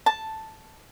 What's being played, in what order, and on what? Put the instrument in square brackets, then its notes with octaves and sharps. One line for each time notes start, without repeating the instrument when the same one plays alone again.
[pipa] A5